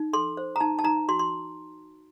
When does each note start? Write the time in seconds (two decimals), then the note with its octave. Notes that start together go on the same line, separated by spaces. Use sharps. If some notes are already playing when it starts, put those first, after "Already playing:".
Already playing: D#4
0.13 A4 C6
0.37 C5
0.56 A#5
0.60 D#4 A5
0.79 A5
0.84 D#4 A#5
1.09 F#4 C6
1.19 C6